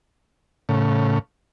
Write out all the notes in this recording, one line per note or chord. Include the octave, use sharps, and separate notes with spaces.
A2 C#3